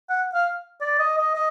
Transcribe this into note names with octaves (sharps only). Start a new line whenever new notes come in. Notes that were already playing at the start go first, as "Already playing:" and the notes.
F#5
F5
D5
D#5
D#5
D#5